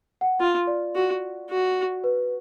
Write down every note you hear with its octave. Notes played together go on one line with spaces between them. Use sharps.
F#5
F4
D5
F#4
F#4
B4